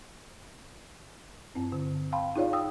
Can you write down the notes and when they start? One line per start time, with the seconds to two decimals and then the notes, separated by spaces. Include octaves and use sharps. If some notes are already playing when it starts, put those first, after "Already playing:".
1.55 G2 C4
1.72 D3
2.12 F5 G5 A5 B5 C6
2.36 D#4 F4 G#4 C#5 D5 F5
2.53 G5 D#6 E6